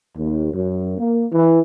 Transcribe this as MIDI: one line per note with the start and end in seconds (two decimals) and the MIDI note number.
0.17 0.53 39
0.54 0.96 42
0.98 1.26 58
1.32 1.59 52